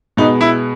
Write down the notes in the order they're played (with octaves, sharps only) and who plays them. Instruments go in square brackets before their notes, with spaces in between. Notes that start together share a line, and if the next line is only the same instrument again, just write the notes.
[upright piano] B2 G#3 B3 [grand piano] D#4
[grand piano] E4